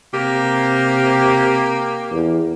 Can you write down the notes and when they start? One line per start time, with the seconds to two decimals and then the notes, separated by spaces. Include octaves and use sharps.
0.14 C3 A#3 G4
2.11 E2